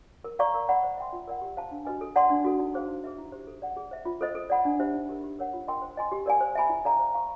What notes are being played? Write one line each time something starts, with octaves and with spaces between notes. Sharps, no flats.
A#4
D5 F5 A#5 C#6
A#4
D5 F#5 B5
C5
E5 G5 C6
F4
A#4 D5 F#5
G4
C5 F5 A5
D4
F#4 B4 D#5 G#5
A4
D5 F#5 A5 C6
D4
F#4 A4
D#4
G#4 C5 F5
D#4
G#4 B4 E5
E4
G4 C5
A4
D5 F#5
G#4
C5 E5
F4
A4 C5 D#5
A4
D5 F#5 B5
D4
G4 C5 E5
D#4
G4 A#4
G4
A#4 C#5 F#5
F4
A#4 D#5 G5 C6
C5
D#5 G#5 C6
G4
A#4 D5 F5 G#5
C5
E5 G#5 B5
E4
A4 D5 F5 A#5
C5
F5 A#5 C#6